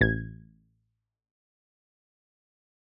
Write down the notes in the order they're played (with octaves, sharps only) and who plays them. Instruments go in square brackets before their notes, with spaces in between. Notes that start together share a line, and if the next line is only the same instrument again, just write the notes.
[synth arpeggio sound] A1 G#6